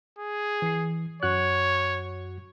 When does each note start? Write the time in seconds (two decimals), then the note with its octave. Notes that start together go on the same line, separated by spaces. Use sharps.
0.19 G#4
0.62 E3 C7
1.23 F#2 F#4 C#5 F#6